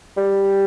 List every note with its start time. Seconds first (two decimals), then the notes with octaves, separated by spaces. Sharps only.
0.17 G3